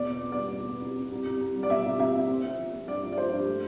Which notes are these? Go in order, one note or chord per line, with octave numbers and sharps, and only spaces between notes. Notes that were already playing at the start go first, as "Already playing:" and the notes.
Already playing: E2 B2 D5
B3
B3
D5
G3
B2
B3
C2
C2
C2
C2
C2
G3
D5
B2 E5
C2
C2 E5
C2
C4
C4
F3
C4
G2 D5
F3
D5
F3 C5
G2
A3